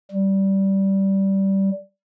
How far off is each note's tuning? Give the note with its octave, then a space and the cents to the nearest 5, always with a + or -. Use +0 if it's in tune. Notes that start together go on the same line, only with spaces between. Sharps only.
G3 -15